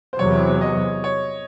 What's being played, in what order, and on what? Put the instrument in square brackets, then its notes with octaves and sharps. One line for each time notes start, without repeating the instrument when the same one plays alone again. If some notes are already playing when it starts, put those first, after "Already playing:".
[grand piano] C5
[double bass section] E2 C3 F#3 [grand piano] C#5
[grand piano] D#5
C#5